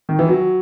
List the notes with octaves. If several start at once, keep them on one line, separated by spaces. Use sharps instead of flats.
D#3
E3
F#3